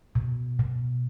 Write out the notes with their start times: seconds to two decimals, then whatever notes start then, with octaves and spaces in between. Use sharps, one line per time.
0.15 B2
0.59 B2